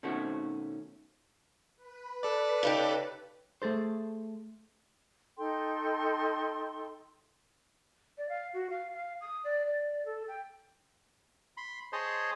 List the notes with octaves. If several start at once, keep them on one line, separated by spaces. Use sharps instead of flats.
B2 D#3 A3 C4 C#4 F#4
B4
A4 D5
C#3 D#4 G4
A3 G#4 A4 C5
D#4 A4 G5 C6
D5
F5
F#4
F5
F5
D#6
D5
D5
A4
G5
B5 C6
G#4 C5 C#5 D#5 A5 C6